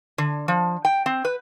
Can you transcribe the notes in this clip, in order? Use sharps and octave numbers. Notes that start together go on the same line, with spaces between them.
D3
F3
G5
C4
B4